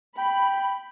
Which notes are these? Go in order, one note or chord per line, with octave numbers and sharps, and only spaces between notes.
G5 B5